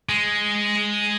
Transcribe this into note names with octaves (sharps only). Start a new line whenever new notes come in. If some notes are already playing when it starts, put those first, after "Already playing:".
G#3